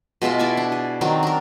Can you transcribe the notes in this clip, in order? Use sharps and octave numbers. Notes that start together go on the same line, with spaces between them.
B2 G#3 F4 E5
E4 D5 E5 G#5
D4
G#4
D#3 F#3 C4 D4
D4 A#4